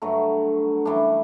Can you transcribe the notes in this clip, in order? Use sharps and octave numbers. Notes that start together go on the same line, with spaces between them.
G2 D3 F#3 A3
F#2 E3 G3 D4